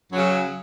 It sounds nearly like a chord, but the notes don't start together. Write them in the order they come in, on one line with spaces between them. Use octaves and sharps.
F#2 F#3 C#3